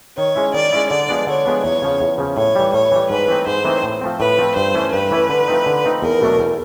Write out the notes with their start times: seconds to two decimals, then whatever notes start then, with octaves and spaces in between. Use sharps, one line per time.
0.17 D#3 C#5
0.36 G#3 C#4 E4
0.54 D#3 D5
0.72 G#3 C#4 E4
0.90 D3 D5
1.09 F3 G#3 B3 D4
1.27 D3 C#5
1.45 F3 G#3 B3 D4
1.63 E2 C#5
1.82 C#3 F3
2.00 E2
2.18 C#3 F3
2.37 A2 C#5
2.56 E3 G3
2.73 A2 C#5
2.92 E3 G3
3.09 G#2 B4
3.28 E3 A3 C4 D#4
3.46 G#2 C5
3.65 E3 A3 C4 D#4
3.83 A2
4.01 F3 A3 C4
4.20 A2 B4
4.38 F3 A3 C4
4.56 G2 C5
4.74 E3 A3 C#4 E4
4.92 G2 B4
5.11 E3 A3 C#4 E4
5.29 D3
5.48 F3 A3 C4 D#4
5.66 D3
5.85 F3 A3 C4 D#4
6.02 E2 A#4
6.21 B2 F#3 A3 D4
6.39 E2